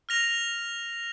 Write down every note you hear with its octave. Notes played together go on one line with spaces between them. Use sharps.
F6 A#6 F7